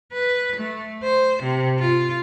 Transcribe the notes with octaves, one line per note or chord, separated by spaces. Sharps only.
B4
A3
C5
C3
F4